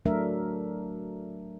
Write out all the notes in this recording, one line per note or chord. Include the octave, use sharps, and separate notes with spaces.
F#3 A3 D4 A#4 E5